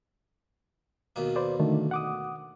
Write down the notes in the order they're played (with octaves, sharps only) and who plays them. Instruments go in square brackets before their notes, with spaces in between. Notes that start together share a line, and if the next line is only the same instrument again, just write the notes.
[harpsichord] D#2 B2 A#3
[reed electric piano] B4 C5 D5
D3 D#3 A3
F#5 D6 D#6